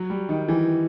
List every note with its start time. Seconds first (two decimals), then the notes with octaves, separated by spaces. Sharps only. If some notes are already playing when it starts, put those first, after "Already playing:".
Already playing: F#3
0.10 G3
0.29 D#3
0.48 E3